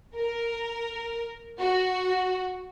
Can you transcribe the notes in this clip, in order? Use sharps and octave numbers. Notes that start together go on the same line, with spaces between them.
A#4
F#4